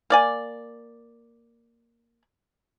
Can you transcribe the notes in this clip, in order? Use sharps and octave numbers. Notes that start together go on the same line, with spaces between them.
A#3 D5 G#5